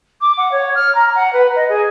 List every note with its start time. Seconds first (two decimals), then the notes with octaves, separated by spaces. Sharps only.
0.21 D6
0.38 F#5
0.52 C#5
0.75 F6
0.95 A#5
1.16 F#5
1.33 B4
1.56 D#5
1.69 G#4